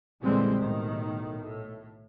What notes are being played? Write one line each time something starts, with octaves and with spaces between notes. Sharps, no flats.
A#1 D3 E3 G3 G#3 C4
B1 A2 D#3
A2